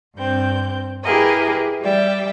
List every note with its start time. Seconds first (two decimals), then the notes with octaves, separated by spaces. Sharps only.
0.17 G2 C4 G6
1.03 E4 G4 G#4 A#4 B4 D#5
1.82 G3 D5 E5 G5